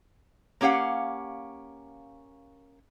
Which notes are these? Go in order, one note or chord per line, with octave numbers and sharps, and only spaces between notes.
A#3 C#4 G4 F5 F#5